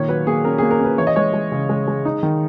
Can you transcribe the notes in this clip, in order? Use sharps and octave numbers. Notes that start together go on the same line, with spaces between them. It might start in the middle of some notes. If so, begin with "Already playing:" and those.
Already playing: A#2 D#3 C#5
F#3 B4
A#3 G#4
C#4 A#4
A#3 G#4
A#4
C#4 B4
E3 C#5
D#5
G#3 C#5
G#3
C#3
G#3
G#3
D#4
D#3